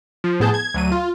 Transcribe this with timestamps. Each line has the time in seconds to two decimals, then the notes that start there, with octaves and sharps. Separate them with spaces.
0.24 F3
0.40 A2 B3 G#4 A5 G6
0.54 G#6
0.74 D2 F#3 D#7
0.92 F4